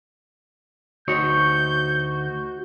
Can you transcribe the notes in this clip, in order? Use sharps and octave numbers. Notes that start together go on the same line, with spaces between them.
D2 D#4 F#4 C#5 G6